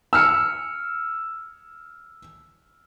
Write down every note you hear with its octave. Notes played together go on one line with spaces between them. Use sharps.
E6 F6 C#7